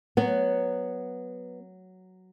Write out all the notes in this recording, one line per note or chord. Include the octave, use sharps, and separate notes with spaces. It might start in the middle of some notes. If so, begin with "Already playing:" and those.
F#3 B3